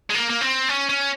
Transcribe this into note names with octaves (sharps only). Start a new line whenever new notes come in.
G#3
A#3
A#3
C4
C#4
C#4